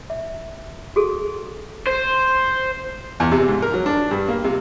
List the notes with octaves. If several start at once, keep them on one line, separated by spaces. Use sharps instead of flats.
E5
F#4 G#4 A4
C5
E2
C3
G#2
A#4
F#3
D4
G2
A#3
C3